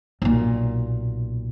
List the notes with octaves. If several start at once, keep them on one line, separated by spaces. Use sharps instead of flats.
B1 A#2